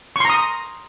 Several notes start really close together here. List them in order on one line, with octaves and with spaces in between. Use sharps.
C#6 C6 A#5 D#6